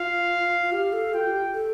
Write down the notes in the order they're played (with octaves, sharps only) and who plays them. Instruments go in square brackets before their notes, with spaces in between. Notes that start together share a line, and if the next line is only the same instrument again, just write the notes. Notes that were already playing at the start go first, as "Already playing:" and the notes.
Already playing: [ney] F4 [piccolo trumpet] F5
[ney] F4
[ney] G4 [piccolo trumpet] F5
[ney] A4
[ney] F4 [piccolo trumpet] G5
[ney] G4
A4